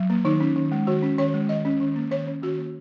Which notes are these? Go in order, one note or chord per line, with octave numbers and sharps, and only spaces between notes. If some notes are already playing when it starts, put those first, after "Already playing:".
Already playing: F#3
A#3
D#3 D#4
C#4
D#3
G#3
D#3 F#4
C#4
D#3 C#5
G#3
D#3 D#5
C#4
D#3
A#3
D#3 C#5
C#4
D#3 F#4
A#3